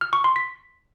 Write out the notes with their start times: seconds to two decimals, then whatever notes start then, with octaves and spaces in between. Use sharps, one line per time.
0.01 F6
0.13 C#6
0.24 C6
0.36 B6